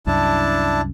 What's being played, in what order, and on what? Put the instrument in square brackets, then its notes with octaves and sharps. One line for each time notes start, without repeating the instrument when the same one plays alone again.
[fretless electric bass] C2 F#2 [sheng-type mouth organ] D4 E4 A5